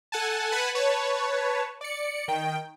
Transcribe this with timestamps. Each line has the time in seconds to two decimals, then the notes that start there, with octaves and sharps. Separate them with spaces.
0.12 A4 F#5 G#5 A5
0.52 B4 F#5 G#5 A5 B5
0.75 B4 C#5 A5
1.81 D5 C#7
2.28 D#3 G5